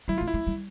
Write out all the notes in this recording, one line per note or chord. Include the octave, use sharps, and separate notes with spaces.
G3 E4
G#3 F4
E4
G#3
G3